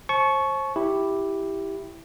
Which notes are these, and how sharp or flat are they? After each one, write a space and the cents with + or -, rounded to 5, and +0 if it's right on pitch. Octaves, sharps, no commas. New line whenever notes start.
C5 +35 A5 -35 C#6 +0
E4 +0 G4 +0